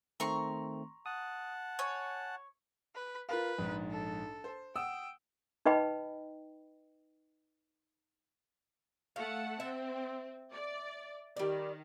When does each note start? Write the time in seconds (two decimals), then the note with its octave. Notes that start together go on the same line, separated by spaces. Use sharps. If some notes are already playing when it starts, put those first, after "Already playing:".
0.20 D#3 A3 C4 A#5 C6 C#6
1.06 F#5 A5 D#6
1.79 C#5 G#5
2.95 B4
3.29 F4 A#4 B4 F5
3.58 A#1 G#2
3.91 A4
4.44 C5
4.76 F#5 G5 D#6 E6
5.66 D#4 B4 D#5 G5 B5
9.16 A3 F5 F#5 A5
9.60 C4 E5
10.52 D5
11.37 D#3 G3 D5